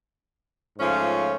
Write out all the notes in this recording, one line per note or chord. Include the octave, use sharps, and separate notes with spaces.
G#2 F3 A3 C#4 F4